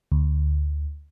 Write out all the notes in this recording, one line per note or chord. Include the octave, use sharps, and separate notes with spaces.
D2